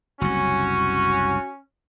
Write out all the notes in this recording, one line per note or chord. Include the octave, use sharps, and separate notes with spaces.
F#1 C2 C#4 F#4